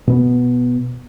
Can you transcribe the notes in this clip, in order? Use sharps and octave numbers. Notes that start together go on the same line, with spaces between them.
B2 B3